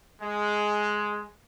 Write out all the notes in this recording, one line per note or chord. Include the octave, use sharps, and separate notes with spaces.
G#3